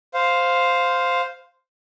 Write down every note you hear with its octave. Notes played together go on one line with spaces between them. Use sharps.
C5 F5